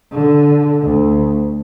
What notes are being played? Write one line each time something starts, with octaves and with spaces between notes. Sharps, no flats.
D3
D2